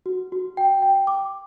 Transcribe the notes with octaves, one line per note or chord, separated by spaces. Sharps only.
F#4
F#4
G5
G5
D6